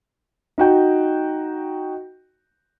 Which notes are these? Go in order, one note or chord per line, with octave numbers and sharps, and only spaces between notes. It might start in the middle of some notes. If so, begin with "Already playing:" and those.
D#4 F#4 G5